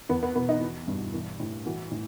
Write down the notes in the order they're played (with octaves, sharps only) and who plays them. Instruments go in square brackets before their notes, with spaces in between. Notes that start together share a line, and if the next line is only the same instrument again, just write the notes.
[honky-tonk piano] E2 B3
B3
B2 B3
D#4
E3
G2
E3
A2
E3 F#4
A2